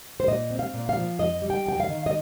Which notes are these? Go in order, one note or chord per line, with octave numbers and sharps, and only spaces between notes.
C5
A#2 D#5
C4
F5
A#2
F5
F3
F2 D#5
G3
G5
F2 G5
F5
D#3
D#5